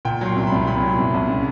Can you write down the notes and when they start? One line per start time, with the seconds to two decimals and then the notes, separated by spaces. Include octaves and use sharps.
0.05 A#2 G5
0.21 F#3 C6
0.36 C2
0.47 C2 B5
0.67 A#2 B5
0.83 F#3
0.98 C2
1.14 C2
1.29 C#3